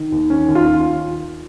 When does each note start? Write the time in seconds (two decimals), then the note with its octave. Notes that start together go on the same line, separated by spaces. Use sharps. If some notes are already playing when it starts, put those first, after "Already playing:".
Already playing: D#3
0.12 D#2
0.30 D#3 C#4
0.48 D#2
0.55 F4